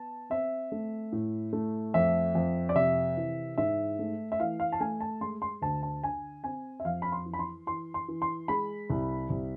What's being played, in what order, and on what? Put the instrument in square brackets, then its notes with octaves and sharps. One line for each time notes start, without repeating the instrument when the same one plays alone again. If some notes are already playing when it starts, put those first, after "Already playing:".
Already playing: [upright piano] B3 A5
C4 E5
A3
A2
A3
F2 E5
F2
D5
C3 E5
E3
G#2 E5
A3
E5
E3 F5
F5
A5
A3 G#5
A5
G#3 C6
C6
D2 A5
A5
D3 G#5
C4 G#5
E5
F2 F5
B5
C6
E3
B5
C6
E3 C6
C6
E3
C6
G#3 B5
C2
C2